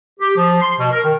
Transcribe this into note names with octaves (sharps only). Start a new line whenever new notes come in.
G4
F3
C6
B2
A#4
D#3